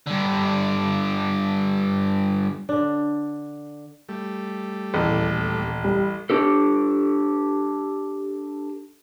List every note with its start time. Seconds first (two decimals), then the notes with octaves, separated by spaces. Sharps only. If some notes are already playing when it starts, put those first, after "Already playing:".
0.07 G2 D3
2.69 D3 D4
4.09 G3 A3
4.94 D#1 A1 E2 A4
5.84 G3
6.30 D4 G4 A4